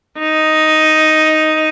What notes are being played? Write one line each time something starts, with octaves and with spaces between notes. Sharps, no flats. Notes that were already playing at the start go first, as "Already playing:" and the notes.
D#4